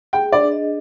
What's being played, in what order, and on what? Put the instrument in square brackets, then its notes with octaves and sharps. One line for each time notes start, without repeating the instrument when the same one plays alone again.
[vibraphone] G#4 [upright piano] G5
[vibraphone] D4 [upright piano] D5
[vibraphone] D#5